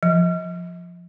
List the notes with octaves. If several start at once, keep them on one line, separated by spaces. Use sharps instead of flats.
F3